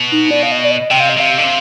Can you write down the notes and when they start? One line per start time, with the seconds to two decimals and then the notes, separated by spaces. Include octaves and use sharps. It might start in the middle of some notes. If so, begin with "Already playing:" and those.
Already playing: B2
0.12 D#4
0.31 D5
0.43 F5
0.52 D#5
0.64 D5
0.71 D#5
0.91 C3 G5
1.00 F5
1.09 D#5
1.17 C3 F5
1.38 D3
1.44 C3